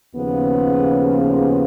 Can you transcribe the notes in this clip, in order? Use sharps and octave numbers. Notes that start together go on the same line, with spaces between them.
D#2 C#3 F3 B3
B3